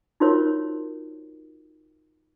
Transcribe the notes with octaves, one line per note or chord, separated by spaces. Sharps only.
D#4 F4 F#4 A#4 C5 C#5